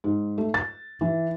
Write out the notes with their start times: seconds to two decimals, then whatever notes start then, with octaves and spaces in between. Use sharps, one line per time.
0.04 G#2
0.38 A3
0.54 A6
1.01 E3